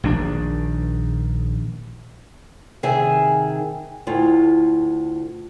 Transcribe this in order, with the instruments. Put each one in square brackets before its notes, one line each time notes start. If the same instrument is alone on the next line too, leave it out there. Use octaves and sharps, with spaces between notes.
[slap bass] A#1 D#3 C4 D4
[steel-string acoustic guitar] C3 D#3 G#4 E5 G#5
D2 A2 F4